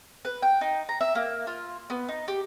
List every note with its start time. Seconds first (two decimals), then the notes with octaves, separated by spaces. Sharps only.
0.25 B4
0.42 G5
0.61 D#4
0.89 A#5
1.01 E5
1.15 A#3
1.47 F4
1.90 B3
2.09 D#4
2.28 G4